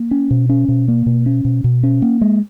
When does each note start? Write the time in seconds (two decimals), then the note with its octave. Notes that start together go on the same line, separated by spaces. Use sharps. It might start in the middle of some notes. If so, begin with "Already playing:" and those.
Already playing: A#3
0.11 C#4
0.31 B2
0.49 C#4
0.68 B2
0.88 A#3
1.06 B2
1.26 C#4
1.45 B2
1.64 B2
1.83 C#4
2.02 A#3
2.21 G#3